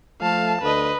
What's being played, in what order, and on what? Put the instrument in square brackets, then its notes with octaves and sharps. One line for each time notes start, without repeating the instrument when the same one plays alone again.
[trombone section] F3 A3 [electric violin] F5 A5
[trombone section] D2 D3 [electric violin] B4 D#5